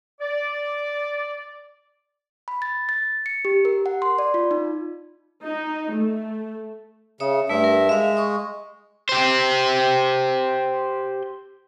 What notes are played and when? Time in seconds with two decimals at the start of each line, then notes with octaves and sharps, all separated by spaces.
0.21 D5
2.48 B5
2.62 A6
2.89 A6
3.26 C#7
3.45 G4
3.65 A#4
3.86 F#5
4.02 C6
4.19 D5
4.34 F4
4.51 D#4
5.44 D#4
5.92 A3
7.20 C#3 C#5 E5 D#6
7.49 G2 A3 E5
7.64 A#4
7.89 G#3 E5 F5
8.17 C#6 D#6
9.09 G4 C5